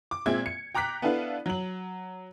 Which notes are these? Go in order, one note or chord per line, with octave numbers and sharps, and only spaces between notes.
D6
A#2 G#3 C4 E5 G#6
C#7
G5 A#5 D6 F#6 B6
B3 D4 E4 A4 B4 F5
F#3 F#7